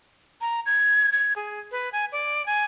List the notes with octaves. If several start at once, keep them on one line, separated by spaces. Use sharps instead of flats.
A#5
G#6
G#6
G#4
B4
G#5
D5
G#5